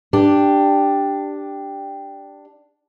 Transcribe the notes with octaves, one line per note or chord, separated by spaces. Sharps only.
D4 G4